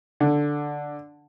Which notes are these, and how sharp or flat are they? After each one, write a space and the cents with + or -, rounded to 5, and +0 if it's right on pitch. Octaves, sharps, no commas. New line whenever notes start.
D3 +0